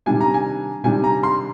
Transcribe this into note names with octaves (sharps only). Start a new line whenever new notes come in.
C3 D#3 G3 D4 G#5
A#5
G#5
C3 D#3 G3 D4 G#5
A#5
C6